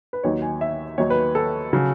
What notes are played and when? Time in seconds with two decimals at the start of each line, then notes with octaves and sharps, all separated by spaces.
0.13 B4
0.23 D#2 D#3 F#3 C#5
0.42 G#5
0.61 E5
0.98 D#2 D#3 F#3 C#5
1.10 B4
1.35 A4
1.73 C#3 F#3